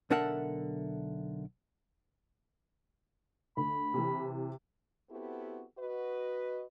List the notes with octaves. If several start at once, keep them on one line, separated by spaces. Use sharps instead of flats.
B1 D3 D4 A#4 E5 F#5
D2 B5
C3 E3
B3 C4 E4 F#4 G4 A4
F#4 B4 D#5